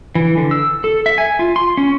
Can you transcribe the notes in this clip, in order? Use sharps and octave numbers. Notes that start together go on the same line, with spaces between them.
E3
D3
E6
A4
E5
G#5
F4
C6
C#4